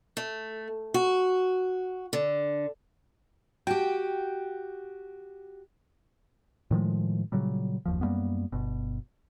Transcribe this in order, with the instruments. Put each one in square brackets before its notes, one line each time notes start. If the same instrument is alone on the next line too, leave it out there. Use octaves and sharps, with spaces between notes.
[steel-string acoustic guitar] A3
F#4
D3
[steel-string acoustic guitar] F#4 G4 [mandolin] G5
[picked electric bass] A2 D#3 F3 G#3
A#2 C#3 F#3 G3
F#1 D#2 F3
F#2 G3 A#3 B3
G1 B2